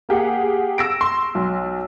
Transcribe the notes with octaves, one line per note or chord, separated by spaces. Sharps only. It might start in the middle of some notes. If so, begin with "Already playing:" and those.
A#3 G4 G#4 F#5
E6 A#6 D7
C6
B1